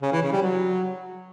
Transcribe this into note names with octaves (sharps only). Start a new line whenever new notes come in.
C#3
E3
C#3
G3
F#3